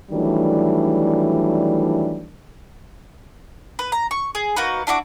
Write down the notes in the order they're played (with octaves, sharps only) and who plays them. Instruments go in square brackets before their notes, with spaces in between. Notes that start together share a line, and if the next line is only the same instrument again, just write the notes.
[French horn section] D#3 E3 F#3 G3 A3 D4
[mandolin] B4
A#5
C#6
G#4
A#3 D#4 F#4 B4
D4 E4 F#4 D6